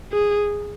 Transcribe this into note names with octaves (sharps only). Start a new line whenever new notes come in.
G#4